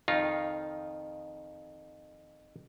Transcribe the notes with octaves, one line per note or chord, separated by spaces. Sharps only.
F2 D#3 D#4 F4